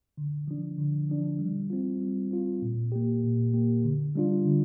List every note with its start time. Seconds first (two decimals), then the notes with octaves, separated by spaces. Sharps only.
0.17 D3
0.48 F3 D4
0.78 D3
1.09 F3 D4
1.39 G3
1.70 C4 F4
2.01 G3
2.31 C4 F4
2.62 A#2
2.92 A#3 G4
3.24 A#2
3.54 A#3 G4
3.84 D3
4.15 G3 D4 F4
4.45 D3